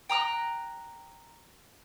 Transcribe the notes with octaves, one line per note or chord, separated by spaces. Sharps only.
G5 A#5 D#6 F#6